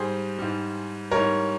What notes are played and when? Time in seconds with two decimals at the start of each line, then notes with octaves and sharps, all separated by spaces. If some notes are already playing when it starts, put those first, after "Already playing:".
Already playing: G#2 G3 G#4 C5
0.39 G#2 G3
1.11 G#2 G3 A#4 C#5